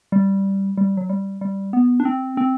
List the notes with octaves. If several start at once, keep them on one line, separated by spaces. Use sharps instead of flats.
G3
G3
F#3
G3
G3
B3
D4
C4
C4